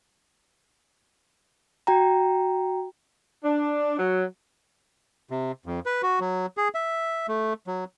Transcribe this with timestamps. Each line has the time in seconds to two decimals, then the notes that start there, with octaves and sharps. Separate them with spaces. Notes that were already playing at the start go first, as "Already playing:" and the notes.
1.87 F#4 G5 A#5
3.44 D4
3.99 F#3
5.30 C3
5.66 F2
5.86 B4
6.03 F#4
6.20 F#3
6.57 G#4
6.75 E5
7.28 A3
7.67 F#3